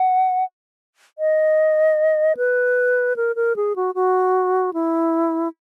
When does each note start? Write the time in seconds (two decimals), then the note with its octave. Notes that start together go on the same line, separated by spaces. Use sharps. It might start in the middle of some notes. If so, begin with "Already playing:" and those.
Already playing: F#5
1.18 D#5
2.37 B4
3.16 A#4
3.36 A#4
3.56 G#4
3.76 F#4
3.95 F#4
4.74 E4